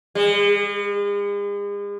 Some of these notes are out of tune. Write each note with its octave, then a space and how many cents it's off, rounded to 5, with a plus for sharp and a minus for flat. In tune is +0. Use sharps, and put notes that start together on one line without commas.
G#3 -40